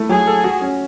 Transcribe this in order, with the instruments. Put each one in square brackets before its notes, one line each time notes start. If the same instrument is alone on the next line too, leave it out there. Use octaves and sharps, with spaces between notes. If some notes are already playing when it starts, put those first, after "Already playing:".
Already playing: [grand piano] A3 E4
[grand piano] F#3 [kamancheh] G#4
[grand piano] A4
F#4
C#4